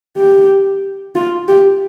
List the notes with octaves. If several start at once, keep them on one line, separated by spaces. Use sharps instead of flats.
G4
F4
G4